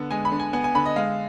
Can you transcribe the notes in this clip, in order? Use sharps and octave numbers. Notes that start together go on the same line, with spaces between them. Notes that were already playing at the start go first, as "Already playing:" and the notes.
Already playing: D3 B3
G#3 G#5
B5
D3
G#5
B3 G#5
G#5
D3 B5
D#5
G#3 F5